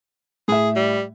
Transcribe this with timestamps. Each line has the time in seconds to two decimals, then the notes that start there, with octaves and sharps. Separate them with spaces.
0.48 A2 G#4 E5
0.76 G3